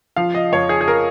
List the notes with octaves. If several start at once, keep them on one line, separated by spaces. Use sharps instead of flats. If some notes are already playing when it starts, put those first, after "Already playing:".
F3 F5
D#5
F2 C#5
G#4
G#4
A#4